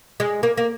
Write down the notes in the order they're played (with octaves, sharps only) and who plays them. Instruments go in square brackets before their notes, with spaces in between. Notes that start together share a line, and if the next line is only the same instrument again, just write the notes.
[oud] G#3
A#3
A#3